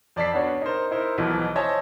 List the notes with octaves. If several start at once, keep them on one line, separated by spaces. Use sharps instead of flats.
F2 D5 A5 B6 C7
B3 C#4 D4 F#4 C#5
D#4 A#4 C5
D#4 E4 A#4 C5
B1 B2 E3 F3
C5 C#5 D#5 E5 G#5 A5